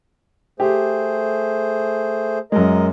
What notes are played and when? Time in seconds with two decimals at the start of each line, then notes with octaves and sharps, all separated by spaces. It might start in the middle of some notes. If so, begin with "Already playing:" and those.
0.60 A3 G4 G#4 C5
2.52 F#2 G#3 A#4 D#5